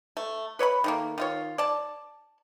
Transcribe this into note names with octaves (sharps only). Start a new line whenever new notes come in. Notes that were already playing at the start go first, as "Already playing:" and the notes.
A3
B4 C#5 D#5 B5
D#3 A3 A#3
D#3 F4 C#5
D5 A5